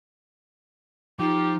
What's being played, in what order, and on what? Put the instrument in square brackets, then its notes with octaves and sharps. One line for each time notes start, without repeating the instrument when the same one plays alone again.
[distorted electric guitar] F3 [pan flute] D#4 [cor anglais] G4